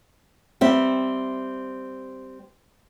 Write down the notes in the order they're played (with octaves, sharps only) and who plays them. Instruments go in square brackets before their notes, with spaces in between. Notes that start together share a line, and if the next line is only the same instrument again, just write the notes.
[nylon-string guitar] G3 C4 E5